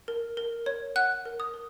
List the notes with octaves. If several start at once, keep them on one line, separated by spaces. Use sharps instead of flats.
A#4
A#4
C#5
F#5 F#6
A#4
D#6
A#4